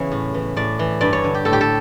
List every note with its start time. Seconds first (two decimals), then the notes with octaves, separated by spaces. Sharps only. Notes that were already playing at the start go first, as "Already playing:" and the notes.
Already playing: E2 C#3 E3 C#5
0.12 A2
0.34 E3
0.56 A2 D5
0.79 E3
1.01 G2 D5
1.13 C#5
1.24 D3
1.35 G4
1.45 A2 A4
1.53 G4
1.61 A4